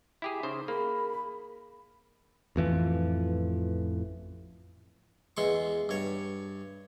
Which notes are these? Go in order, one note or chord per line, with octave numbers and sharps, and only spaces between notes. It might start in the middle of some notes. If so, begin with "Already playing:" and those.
E4 G4 G#4
C#3 D#4 C5
A#3 G#4 A#4 B5
A1 F2 E3 F3
E2 G#3 C6 C#6
G2 C#5